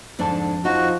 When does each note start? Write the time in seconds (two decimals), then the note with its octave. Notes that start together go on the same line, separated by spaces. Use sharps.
0.19 F2 G#2 D3 D4 A5
0.65 F3 D#4 F#4